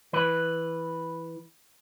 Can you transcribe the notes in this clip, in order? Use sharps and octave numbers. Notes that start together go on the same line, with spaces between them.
E3 B4